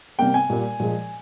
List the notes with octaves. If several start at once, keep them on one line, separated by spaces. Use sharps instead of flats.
C3 G3 A#3 G5
G#5
A#2 G3 A#3
A#2 F3 G#3